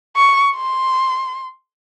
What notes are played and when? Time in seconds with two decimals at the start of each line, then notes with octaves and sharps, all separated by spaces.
0.16 C#6
0.56 C6